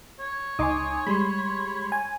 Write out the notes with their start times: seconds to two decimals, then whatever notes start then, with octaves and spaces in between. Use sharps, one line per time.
0.19 C#5
0.59 C#2 D#4 G#5 C6 D6 D#6
1.07 G3 G#3 B5 C6
1.92 G#5